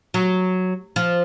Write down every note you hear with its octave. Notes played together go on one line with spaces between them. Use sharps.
F#3
F3